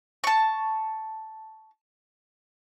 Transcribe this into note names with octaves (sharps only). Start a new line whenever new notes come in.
A5 C#6